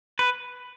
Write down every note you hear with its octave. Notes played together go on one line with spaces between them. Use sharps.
B4